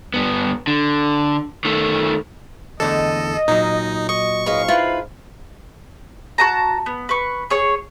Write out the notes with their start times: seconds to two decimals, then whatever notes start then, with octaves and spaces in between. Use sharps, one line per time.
0.14 G2 B3
0.67 D3
1.65 D#3 A3
2.80 E2 D3 A3 A4 D#5
3.48 A#2 F#3 D#4
4.09 D#5 C#6
4.46 G#2 B4 C#5 D#5 F5
4.68 E4 F4 B4
6.38 F#4 A5 A#5
6.86 B3
7.09 B4 C#6
7.50 G#4 C#5 C#6